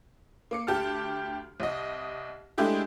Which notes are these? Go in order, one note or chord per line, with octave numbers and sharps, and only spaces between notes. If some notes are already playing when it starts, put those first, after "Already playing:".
A#3 D6 C#7
D2 G4 A5 F6
C2 D#5
G#3 A3 D4 E4 G4 G#4